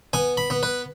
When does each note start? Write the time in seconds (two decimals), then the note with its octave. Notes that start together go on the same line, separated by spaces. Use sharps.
0.13 B3 G#5
0.37 B5
0.50 B3
0.63 B4